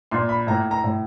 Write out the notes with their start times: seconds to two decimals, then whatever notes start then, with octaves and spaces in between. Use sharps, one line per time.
0.11 A#2 C6
0.29 B5
0.47 A2 A#5
0.71 A#5
0.84 A2